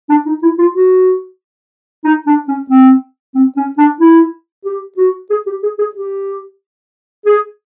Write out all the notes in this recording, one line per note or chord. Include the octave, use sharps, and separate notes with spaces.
D4
D#4
E4
F4
F#4
D#4
D4
C#4
C4
C4
C#4
D4
E4
G4
F#4
G#4
G4
G#4
G#4
G4
G#4